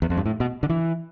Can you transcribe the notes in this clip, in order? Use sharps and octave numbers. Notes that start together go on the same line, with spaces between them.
E2
F2
G2
A2
B2
D3
E3